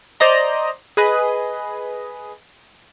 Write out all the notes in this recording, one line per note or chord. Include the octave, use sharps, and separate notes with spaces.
C5 D5 D#5 A#5
G#4 B4 D#5